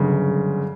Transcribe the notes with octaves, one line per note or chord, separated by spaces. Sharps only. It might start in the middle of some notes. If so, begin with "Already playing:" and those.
Already playing: G1 F#2 C#3